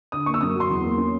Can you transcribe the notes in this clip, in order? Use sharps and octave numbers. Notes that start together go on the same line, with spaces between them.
D3 D#6
A#3 C#6
E6
F#2 D#6
F#3 C6
E2
A#3
C#4